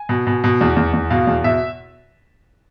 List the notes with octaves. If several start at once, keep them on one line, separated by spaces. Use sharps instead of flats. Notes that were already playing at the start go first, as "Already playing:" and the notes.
Already playing: G#5
B2
B2
B2
E2
E2
E2
B2 F5
E2
B2 E5